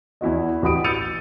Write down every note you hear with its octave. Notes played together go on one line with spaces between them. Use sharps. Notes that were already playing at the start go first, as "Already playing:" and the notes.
E2 E4 F#4 D#5
A1 F#4 G4 B5 D#6 D7
E6 G6 A6 C#7 D#7 F7